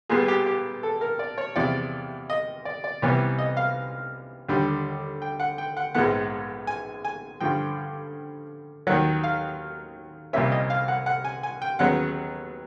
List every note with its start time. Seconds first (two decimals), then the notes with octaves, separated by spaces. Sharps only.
0.09 A#2 G3 B3 G#4
0.28 G4
0.46 G4
0.83 A4
1.01 A#4
1.19 D5
1.38 C#5
1.56 E2 C3 F3 D5
2.30 D#5
2.65 D5
2.84 D5
3.02 C2 C3 E3 G3 B3 C#5
3.39 D#5
3.57 F5
4.48 D#2 D3 G3
5.22 G5
5.40 F#5
5.58 G5
5.77 F#5
5.94 A#1 G#2 F3 G#3 B3 F#5
6.67 G#5
7.05 G#5
7.41 G2 D3 F3 G5
8.87 D#2 D#3 F#3 F#5
9.23 F5
10.33 C2 A#2 G3 A#3 C#4 E5
10.52 D#5
10.70 F5
10.88 F#5
11.06 F#5
11.25 G#5
11.43 G#5
11.62 G5
11.79 D#2 C#3 F#3 B3 F#5